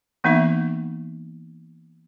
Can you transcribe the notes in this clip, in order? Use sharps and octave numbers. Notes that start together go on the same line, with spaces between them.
E3 A#3 B3 D#4 E5 C#6